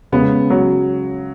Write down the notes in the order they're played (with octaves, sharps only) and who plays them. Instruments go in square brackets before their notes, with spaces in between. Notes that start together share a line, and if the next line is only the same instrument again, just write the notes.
[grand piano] C#3 G#3 C#4 G#4 [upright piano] B3
[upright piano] F#3